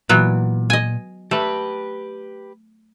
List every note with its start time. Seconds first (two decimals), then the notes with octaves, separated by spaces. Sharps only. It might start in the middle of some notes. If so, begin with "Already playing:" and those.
0.09 A#2 E3 F#3 B3
0.70 D#5 G#5
1.31 A3 G4 B4